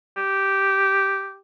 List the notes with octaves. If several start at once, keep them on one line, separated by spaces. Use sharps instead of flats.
G4